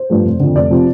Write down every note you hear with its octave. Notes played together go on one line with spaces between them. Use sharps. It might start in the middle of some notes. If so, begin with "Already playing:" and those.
Already playing: C5
G2 F3 A3
F1
F2 D3
F1 D5
C3 F3